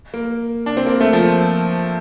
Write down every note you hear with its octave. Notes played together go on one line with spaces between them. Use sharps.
A#3
D4
C4
A#3
A3
F3